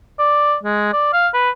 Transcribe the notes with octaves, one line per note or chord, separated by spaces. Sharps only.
D5
G#3
D5
F5
B4